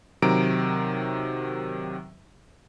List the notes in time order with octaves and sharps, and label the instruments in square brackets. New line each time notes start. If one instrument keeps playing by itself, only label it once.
[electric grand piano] C3 D#3 F#3 A#5 D7